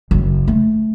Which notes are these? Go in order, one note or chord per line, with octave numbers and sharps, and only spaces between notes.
F#1
A3